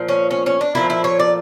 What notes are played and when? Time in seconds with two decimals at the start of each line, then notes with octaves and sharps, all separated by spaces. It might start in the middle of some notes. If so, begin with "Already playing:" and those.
Already playing: A#2 F3
0.09 C#4
0.31 C#4
0.46 C#4
0.61 D4
0.75 A#2 F3 A3 E4
0.90 E4
1.04 C#5
1.19 D5